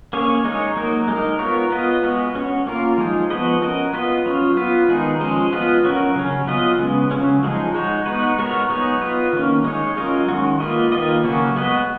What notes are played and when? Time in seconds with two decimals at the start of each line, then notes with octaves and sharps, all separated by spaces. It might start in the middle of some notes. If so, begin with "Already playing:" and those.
0.13 A#3 C#4 G#4 C#5
0.45 G#3 D#4 G#4 C#5
0.76 F#3 A#3 D#4 A#4
1.08 G#3 D#4 A#4
1.39 B3 F4 A#4 C#5
1.72 B3 F4 B4 D#5
2.03 G#3 B3 F#4 B4
2.35 C#4 F#4 C#5
2.67 A#3 C#4 F4 A#4
2.98 F3 G#3 D#4 G#4
3.30 F3 B3 F#4 B4 D#5
3.62 C#4 F#4 A#4 D#5
3.93 B3 F4 B4 D#5
4.26 F#3 C#4 F4
4.57 B3 F4 B4
4.88 D#3 G#3 B3 D#4 G#4
5.21 F3 G#3 C#4 G#4 D#5
5.53 B3 F4 B4 D#5
5.85 F#3 C#4 F#4 A#4
6.16 C#3 F#3 C#4
6.48 F#3 B3 F4 B4 D#5
6.79 C#3 G#3 B3
7.11 C#3 F#3 C#4
7.43 F3 G#3 D#4 G#4
7.74 G#3 D#4 F#4 C#5
8.06 G#3 B3 D#4 F#4 B4
8.38 G#3 B3 F#4 A#4 C#5
8.69 F#3 B3 D#4 G#4 C#5
9.01 B3 F4 B4 D#5
9.33 D#3 A#3 C#4
9.64 G#3 D#4 G#4 C#5
9.97 F#3 C#4 F4 A#4 D#5
10.28 D#3 G#3 C#4 F#4
10.60 A#3 F4 B4 D#5
10.92 D#3 A#3 F4 B4 D#5
11.24 C#3 F#3 A#3 C#4 F#4
11.56 G#3 B3 F#4 B4 D#5